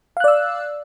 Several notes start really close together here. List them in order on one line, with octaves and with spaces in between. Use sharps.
F5 F#6 D5 E6